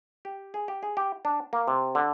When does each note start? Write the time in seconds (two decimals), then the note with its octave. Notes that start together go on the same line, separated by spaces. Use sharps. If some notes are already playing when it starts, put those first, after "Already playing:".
0.25 G4
0.54 G#4
0.68 G4
0.83 G#4
0.97 G4
1.25 D4
1.53 A#3
1.68 C3
1.95 D3